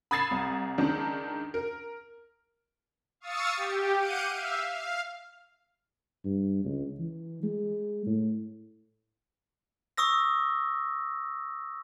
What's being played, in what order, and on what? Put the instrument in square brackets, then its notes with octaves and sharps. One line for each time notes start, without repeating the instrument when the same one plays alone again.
[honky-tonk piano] B5 D#6 G#6 A6 C7 E7
C2
C#2 D#3 D4
A#4
[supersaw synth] F5 C#6 D#6 E6 A6 C#7
G4
F5 F#5 D6 G6 C#7 D#7
E5 F5
F5
[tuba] G2
C#2
E3
G#3
A2
[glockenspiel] C#6 D#6 E6 A#6